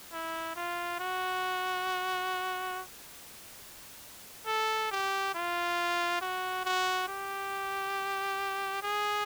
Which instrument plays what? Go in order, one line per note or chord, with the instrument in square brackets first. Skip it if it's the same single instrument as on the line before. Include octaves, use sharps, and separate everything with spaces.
[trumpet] E4
F4
F#4
A4
G4
F4
F#4
F#4
G4
G#4